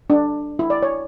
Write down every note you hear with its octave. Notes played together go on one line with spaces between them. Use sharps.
D4
E4
D5
C#5